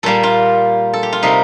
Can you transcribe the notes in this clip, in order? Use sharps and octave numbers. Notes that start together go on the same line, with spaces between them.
A#2 G3 A#3 A4
F4
A4
G4
F4
C3 G3 A#3 D#4